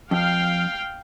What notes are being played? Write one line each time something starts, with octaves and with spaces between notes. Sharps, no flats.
F2 F5 G5